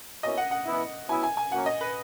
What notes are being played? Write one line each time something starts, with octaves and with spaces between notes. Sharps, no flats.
B2 A#3 C#4 E4 D#5
F#5
F#5
E3 B3 E4
F#3 B3 E4 G#5
G#5
G#5
F#3 A#3 C#4 F#5
D#5
B4